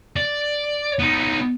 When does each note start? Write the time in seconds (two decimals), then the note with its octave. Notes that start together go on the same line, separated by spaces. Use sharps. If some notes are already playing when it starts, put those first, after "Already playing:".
0.16 D5
0.99 B3 D#4